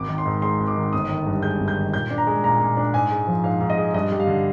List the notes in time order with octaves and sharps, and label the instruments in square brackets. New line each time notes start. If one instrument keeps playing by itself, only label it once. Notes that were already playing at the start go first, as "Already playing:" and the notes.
Already playing: [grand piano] G#1 D6
D#3
C6
G#2
G#3 C6
G#1
D6
D#3
G1 D#6
D#3
G2
G#3 G6
G1
G6
D#3
A#2 G6
D4
A#5
G#3
A#2 A#5
A#2
D4
G#2 G#5
G#3
F3
G#2 F5
G#2
D#5
G#3
G2 D#5
G3
F5
D3